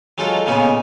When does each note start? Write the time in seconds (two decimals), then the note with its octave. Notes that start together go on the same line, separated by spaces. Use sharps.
0.18 F#3 G#3 D#4 F4 A4
0.46 A#2 C#3 B3 C#4 D#4